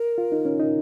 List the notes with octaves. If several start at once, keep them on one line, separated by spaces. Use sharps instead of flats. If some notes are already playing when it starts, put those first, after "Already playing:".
Already playing: A#4
F4
D#4
C#4
D#4